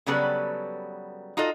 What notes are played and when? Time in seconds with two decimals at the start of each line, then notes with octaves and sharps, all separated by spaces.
0.06 C#3 F#3 G3 B3 A4 B4
1.37 D#4 F4 F#4 A4 D#5